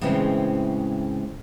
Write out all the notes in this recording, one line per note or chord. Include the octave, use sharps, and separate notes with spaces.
A2 C#3 E3 G#3 C4 C#4